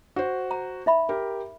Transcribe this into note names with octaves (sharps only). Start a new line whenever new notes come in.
F#4 C5
A#5
D#4 E5 B5
G4 A#4